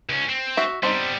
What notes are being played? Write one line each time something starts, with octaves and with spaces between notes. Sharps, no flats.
C#2 C#4
C4
F#4 E5
G3 B3 C4 D4 D#4